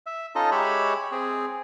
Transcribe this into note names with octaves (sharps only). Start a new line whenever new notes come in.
E5
C#4 D#4 F4 A4 D#5
G#3 G4 C#5 E5 B5
C4 G#4